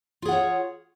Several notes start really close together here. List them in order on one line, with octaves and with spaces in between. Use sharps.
F4 G#4 F#5 C#5